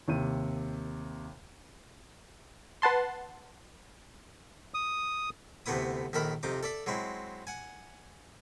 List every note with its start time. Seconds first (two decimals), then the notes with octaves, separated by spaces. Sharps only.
0.08 D#2 C3 D#7
2.82 B4 F#5 A5 C6
4.74 D#6
5.66 D2 C3 A3 B3 E4 D#6
6.13 A#1 D#3 A4 A#4 E5 B5
6.43 F2 C3 D#4 D6
6.63 A4 D5 E5
6.86 F#3 G#3 C4 E4
7.47 F#5 G#5